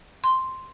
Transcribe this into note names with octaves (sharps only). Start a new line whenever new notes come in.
C6